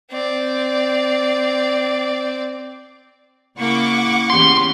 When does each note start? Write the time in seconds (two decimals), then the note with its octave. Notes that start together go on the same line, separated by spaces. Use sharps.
0.11 C4 D5
3.59 C#3 A#3 E4 F#5 C#6 D6
4.30 E2 C#4 G4 C6